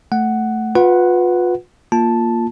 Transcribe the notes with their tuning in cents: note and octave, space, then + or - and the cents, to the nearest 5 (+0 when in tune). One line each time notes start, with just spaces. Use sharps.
A3 +0 F#5 +5
F4 +35 B4 +0 F#5 +0
A#3 +0 F4 +0 A5 -5